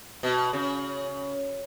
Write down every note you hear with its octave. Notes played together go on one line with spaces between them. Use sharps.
B2
C#3